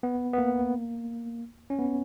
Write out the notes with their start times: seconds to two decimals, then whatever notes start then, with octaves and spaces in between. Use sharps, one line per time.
0.03 B3
0.33 B3
0.38 A#3
1.70 C#4
1.79 B3